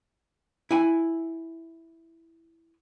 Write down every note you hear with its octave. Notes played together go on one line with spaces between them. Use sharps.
E4 G#5